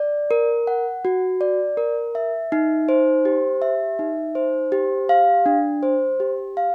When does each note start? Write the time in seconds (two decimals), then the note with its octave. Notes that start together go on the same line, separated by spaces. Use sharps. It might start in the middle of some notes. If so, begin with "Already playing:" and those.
Already playing: D5
0.31 A#4
0.67 F#5
1.05 F#4
1.41 D5
1.77 A#4
2.15 E5
2.52 D#4
2.89 C5
3.25 G4
3.62 E5
3.99 D#4
4.35 C5
4.72 G4
5.09 F5
5.46 D4
5.83 C5
6.20 G4
6.57 F5